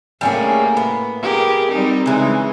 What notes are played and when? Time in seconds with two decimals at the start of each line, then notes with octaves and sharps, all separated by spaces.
0.21 A2 G3 A#3 C#4 G#4
0.77 B3
1.22 G4 G#4 A#4
1.71 G3 C4 D#4
2.06 C#3 E3 G#3 D#4